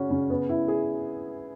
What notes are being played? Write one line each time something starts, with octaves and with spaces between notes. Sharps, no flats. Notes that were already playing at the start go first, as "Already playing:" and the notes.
Already playing: C#3 C#4 F#4
C#3
B3
E4
G#4